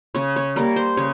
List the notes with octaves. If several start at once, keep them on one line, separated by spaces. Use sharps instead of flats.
C#3 C#5
C#5
G3 A#3 A#4
C5
C#3 C#5